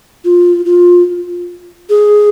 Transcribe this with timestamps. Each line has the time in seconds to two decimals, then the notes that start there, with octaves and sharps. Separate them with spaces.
0.25 F4
0.65 F4
1.90 G#4